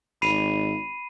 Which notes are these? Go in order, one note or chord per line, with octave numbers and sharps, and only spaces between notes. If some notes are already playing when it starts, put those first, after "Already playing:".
G#1 B5 C7 D#7